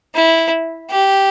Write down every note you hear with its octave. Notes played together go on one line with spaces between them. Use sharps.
E4
G4